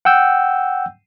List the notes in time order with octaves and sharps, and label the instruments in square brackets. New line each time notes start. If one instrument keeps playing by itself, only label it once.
[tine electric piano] F#5 G5 E6 G6